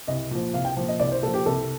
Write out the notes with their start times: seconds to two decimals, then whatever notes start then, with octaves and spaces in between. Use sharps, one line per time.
0.08 C2 D#5
0.31 A#2 F3
0.53 C2 F5
0.65 G5
0.77 A#2 F3
0.88 D#5
0.99 C2 D5
1.12 C5
1.22 A#2 A4
1.27 F3
1.34 G4
1.46 C2 A4